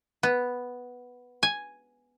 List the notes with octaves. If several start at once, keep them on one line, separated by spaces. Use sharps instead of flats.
B3
G#5